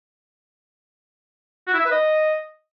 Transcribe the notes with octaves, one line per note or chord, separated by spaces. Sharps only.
F#4
E4
E5
B4
D#5